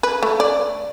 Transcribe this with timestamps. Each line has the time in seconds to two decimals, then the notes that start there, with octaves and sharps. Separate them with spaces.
0.03 B4
0.23 A3
0.40 D5